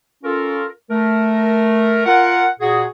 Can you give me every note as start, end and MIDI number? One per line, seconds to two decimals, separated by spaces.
0.24 0.65 61
0.24 0.65 65
0.24 0.65 69
0.24 0.65 70
0.91 2.02 57
0.91 2.02 70
2.06 2.46 65
2.06 2.46 70
2.06 2.46 78
2.60 2.84 46
2.60 2.84 66
2.60 2.84 68